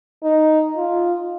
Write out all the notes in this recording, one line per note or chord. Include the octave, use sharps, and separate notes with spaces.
D#4
F4